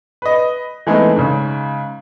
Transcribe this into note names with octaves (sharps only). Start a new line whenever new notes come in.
B4 D#5
E3 G#3 A3 B3 C4 D#4
G#2 C#3